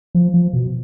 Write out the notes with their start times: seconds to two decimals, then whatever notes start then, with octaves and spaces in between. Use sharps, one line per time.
0.15 F3
0.34 F3
0.53 B2